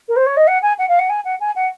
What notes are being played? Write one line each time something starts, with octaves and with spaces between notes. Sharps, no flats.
A#4
C5
C#5
D#5
F#5
G#5
F#5
F5
F#5
G#5
F#5
G#5
F#5